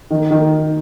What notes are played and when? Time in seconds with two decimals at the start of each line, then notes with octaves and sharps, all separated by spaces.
0.11 D#3
0.31 D#3